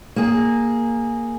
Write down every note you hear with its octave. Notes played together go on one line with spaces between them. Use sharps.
A#3 G#4